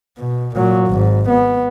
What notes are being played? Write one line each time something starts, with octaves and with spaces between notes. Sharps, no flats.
B2
A#2 F#3
G#1 G#2
B3